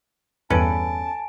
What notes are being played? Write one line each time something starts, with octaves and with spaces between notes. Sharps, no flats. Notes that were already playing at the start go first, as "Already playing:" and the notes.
E2 G2 C#4 A4 B4 G#5 A5 D7